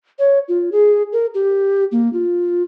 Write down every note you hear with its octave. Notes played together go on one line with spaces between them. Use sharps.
C#5
F4
G#4
A#4
G4
A#3
F4